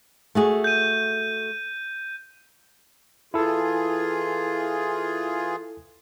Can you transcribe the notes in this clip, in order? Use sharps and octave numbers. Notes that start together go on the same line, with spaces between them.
A3 F#4 G#4
G6 D#7
E3 E4 F4 G#4 A4